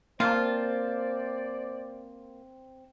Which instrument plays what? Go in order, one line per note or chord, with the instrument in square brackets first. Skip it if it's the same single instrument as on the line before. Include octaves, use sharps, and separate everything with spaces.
[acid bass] A#3 [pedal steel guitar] C4 A5 [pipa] F4 [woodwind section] C5 D5